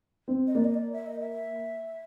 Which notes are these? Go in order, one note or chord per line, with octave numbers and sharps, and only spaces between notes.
C4
D#5
A#3 D5
D#5
D5
E5
D#5
E5